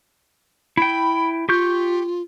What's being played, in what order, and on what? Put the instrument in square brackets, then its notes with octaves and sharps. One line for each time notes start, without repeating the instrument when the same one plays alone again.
[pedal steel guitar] E4 G5 [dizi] B5
[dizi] F4 [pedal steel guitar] G4 C#6 G6